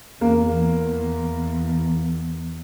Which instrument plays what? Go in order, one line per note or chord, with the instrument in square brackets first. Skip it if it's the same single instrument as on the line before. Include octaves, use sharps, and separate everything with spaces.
[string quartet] E2 [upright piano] A#3